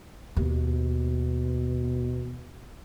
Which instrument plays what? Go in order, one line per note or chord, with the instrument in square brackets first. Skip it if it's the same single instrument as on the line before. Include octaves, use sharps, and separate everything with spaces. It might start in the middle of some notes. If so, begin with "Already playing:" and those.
[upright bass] D#2 [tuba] B2